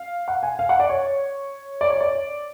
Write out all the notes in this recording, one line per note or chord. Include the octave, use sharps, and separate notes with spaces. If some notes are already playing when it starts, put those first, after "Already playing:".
Already playing: F5
F#5
G#5
F5
F#5
D5
C#5
D5
C#5
D5